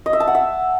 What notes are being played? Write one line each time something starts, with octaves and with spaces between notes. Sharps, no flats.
D#5
E5
A5
F#5
E5